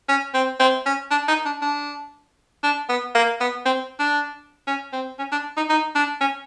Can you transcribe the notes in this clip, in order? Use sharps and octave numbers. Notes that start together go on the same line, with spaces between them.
C#4
C4
C4
C#4
D4
D#4
D4
D4
D4
B3
A#3
B3
C4
D4
C#4
C4
C#4
D4
D#4
D#4
D4
C#4